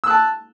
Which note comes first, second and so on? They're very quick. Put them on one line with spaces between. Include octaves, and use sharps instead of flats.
E6 F#6 A5